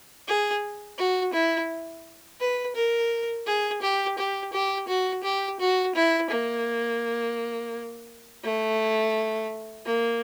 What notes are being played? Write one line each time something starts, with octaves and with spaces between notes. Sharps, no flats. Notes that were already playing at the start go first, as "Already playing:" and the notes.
G#4
F#4
E4
B4
A#4
G#4
G4
G4
G4
F#4
G4
F#4
E4
A#3
A3
A#3